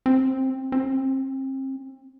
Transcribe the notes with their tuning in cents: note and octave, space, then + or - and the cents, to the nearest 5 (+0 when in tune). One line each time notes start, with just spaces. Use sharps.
C4 +15
C4 +35